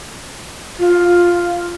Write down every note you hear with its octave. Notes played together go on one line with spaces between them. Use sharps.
F4